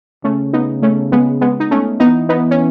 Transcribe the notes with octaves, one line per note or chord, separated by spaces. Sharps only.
C#3 A3 C#4
B3 D#4
A3 C#4
G#3 B3
G#3 B3
D#4
A3 C#4
E3 B3 D#4
B3 D#4
C#4